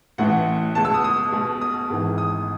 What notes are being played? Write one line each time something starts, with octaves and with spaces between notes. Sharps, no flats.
A1 A2 E3 F#5
C#2 B2 A5
E6
D#6
D#6
B1 B2
D#6
G#1 G#2 E3
D#6